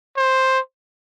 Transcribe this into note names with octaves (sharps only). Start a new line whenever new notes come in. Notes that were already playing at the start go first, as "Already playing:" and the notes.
C5